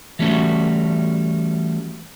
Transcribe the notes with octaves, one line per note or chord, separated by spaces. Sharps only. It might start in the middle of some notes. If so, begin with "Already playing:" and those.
E3 G3 A3 C#4 F#4